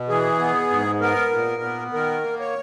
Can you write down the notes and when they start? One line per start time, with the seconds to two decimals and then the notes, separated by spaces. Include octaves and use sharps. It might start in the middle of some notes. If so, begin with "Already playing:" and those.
Already playing: B2
0.09 E3 G#4
0.39 B3
0.70 G#2
1.01 B3 A#4
1.32 A#2
1.62 B3
1.93 D#3 A#4
2.24 A#3
2.39 C#5